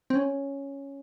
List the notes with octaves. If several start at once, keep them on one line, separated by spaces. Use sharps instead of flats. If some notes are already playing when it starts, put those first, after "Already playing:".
C4
C#4